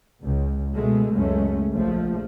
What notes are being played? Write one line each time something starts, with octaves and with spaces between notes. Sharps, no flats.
C#2
B2 G#3 A3
C#2 F#2 G#3 A3 C#4
A#1 F3 A3